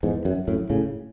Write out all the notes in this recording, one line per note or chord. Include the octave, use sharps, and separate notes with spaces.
E2 G#2
F#2
F#2 A2
A2 C#3